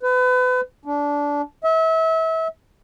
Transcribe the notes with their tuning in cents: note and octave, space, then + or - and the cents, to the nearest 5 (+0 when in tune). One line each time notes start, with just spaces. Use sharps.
B4 +35
D4 -20
E5 -30